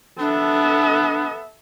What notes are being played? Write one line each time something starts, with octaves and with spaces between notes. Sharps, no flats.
B3 D4 A4 E5